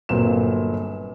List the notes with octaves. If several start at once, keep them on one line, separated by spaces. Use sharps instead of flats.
G1 A#2 F#3 C4 E7